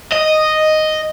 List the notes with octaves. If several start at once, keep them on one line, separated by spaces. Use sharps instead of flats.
D#5